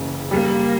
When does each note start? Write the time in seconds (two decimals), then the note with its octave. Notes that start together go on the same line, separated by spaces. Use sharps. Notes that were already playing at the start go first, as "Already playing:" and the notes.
Already playing: F#1 C#3 E3
0.31 G3 A#3